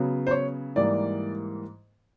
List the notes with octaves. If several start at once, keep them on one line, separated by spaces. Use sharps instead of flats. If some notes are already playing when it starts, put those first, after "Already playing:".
Already playing: C#3 F#3 B3
C5
C#5
G#2 E3 G3 A#3 D5